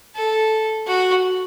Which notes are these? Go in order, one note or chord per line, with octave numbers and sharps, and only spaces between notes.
A4
F#4